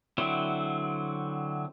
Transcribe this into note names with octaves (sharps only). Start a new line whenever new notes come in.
D3 F#3 C4 E4